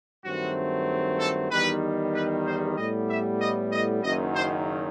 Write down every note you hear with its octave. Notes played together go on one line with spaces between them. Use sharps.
G2 D#3 F#3 A3 C4 F#4
A4
E2 D#3 G3 B4
B4
C5
A2 G3 B3 D#5
E5
D#5
D#5
F#1 F#2 D#3 D#5
C5